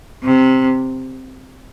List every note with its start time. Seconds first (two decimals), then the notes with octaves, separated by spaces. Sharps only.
0.24 C3